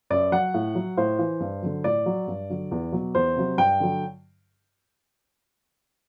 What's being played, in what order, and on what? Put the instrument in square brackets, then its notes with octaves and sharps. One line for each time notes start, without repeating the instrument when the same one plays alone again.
[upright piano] F#2 D5
F#3 F#5
A2
F#3
A2 C5
E3
G2
D3 F#3
A2 D5
F#3
G2
D3 F#3
E2
B2 F#3
E2 C5
C3 F#3
G2 G5
D3 F#3